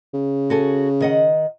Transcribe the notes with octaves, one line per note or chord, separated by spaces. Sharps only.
C#3
F#4 A4 G#5
D#3 D#5 F#5